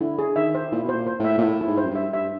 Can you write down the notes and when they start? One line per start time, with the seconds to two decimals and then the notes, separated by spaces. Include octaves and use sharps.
0.01 D3 E4
0.19 G#4
0.36 D#3 E5
0.55 C5
0.72 A#2 E4
0.84 B2
0.89 C5
0.95 A#2
1.07 C5
1.20 A2 E5
1.38 A#2
1.42 A2 E4
1.61 E4
1.67 G#2
1.78 C5
1.85 F#2
1.91 G2 E5
2.13 G2 E5